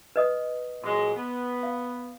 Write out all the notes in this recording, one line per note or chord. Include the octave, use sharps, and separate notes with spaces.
B4 D#5 D#6
A#2 F#3 G#3 C6
B3
F5